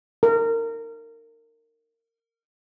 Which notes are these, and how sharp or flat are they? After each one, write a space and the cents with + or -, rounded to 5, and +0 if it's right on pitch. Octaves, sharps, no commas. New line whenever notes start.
A#4 -25